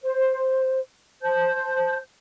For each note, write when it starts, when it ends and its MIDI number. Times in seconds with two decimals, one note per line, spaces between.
0.01 0.79 72
1.22 1.97 72
1.22 1.97 81
1.22 1.97 91